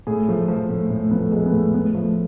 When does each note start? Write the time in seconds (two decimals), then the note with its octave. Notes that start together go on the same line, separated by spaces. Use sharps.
0.07 A2 G#4
0.29 F3 A3
0.48 F3
0.70 A2
0.90 A2 A3
1.11 F3 B3
1.18 A3
1.31 F3 G#3
1.39 A3
1.46 B3
1.52 A2
1.74 A2 B3
1.95 F3 A3